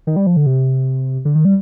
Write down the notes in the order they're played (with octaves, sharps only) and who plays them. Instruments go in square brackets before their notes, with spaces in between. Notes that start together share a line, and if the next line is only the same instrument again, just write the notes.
[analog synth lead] D#3
G3
F3
D3
C3
D3
D#3
G3